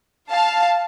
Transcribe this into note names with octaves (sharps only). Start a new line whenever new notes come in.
F5 A5